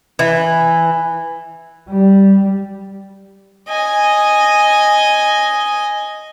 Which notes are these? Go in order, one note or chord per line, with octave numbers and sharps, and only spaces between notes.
E3
G3
D#5 G#5